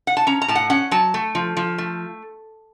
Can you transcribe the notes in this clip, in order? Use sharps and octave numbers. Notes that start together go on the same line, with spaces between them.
F#5
A5
C#4 A#5
A#5
A2 A5
F#5
C#4 F#5
F#3 A5
A3
F3
F3
A3